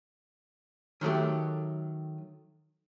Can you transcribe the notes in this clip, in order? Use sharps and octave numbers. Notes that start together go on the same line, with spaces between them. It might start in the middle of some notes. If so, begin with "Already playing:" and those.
D#3 F#3 A3 G4